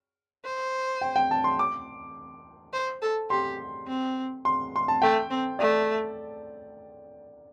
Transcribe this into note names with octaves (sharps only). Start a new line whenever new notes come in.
C5
G5
G5
A5
C6
D6
C5
A4
G4 C6
C4
C6
C6
A5
A3 G5
C4
A3 D5